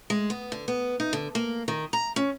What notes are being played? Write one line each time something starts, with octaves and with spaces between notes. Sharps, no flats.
G#3
B3
D3
B3
D#4
D3
A#3
D#3
A#5
C#4